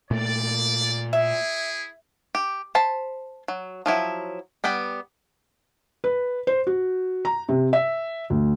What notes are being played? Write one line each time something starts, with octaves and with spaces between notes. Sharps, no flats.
A#2 A3 D5
E4 G#4 E5
G4
C5 A5 B5
F#3
F3 F#3 E4
G3 B3 G5 B5
B4
C5
F#4
A#5
C3
E5
D2